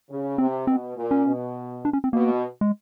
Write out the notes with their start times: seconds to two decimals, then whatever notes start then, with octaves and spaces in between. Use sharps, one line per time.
0.10 C#3
0.38 C3 C4
0.67 B2 C4
0.97 A#2
1.11 C#4
1.26 B2
1.85 D4
1.93 C#4
2.04 C4
2.13 B2 A#3
2.61 G#3